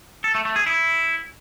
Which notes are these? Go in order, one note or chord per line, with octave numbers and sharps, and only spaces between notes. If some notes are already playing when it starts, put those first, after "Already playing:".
A4
A3
A3
G#4
E4